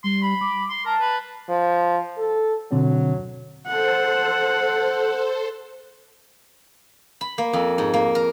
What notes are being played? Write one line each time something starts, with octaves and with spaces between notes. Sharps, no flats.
G3 C6
B5
D6
C6
A#4 A5
B4
F3
A4
B2 D3 F#3 C4
A4 C5 F#5
B5
A#3
F2
G#2
A#3
A#4